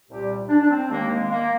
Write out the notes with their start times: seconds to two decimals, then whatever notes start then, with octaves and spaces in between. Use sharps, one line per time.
0.08 C2 A#2 G3 G4
0.49 D4
0.60 D4
0.69 C4
0.89 D#2 D#3 G#3 A#3
1.09 G#3
1.30 A#3